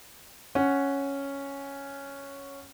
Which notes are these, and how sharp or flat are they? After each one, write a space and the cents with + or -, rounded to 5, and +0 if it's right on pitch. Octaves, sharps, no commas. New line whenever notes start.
C#4 +0 F#5 +0